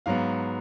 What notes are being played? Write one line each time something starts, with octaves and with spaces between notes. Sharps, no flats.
G#2 F#3 B3 F5